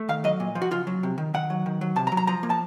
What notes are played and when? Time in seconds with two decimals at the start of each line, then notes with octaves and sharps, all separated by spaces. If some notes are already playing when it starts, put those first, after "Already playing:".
Already playing: A3
0.09 D#3 F5
0.24 F#3 D#5
0.40 A#2
0.55 F3
0.62 F#4
0.71 C#3 F4
0.87 F#3
1.03 C3
1.18 D#3
1.34 D#3 F#5
1.50 F#3
1.66 D#3
1.81 F#3
1.96 C3 A5
2.07 A#5
2.12 F#3
2.17 A#5
2.27 F3 A#5
2.43 A#3
2.50 A5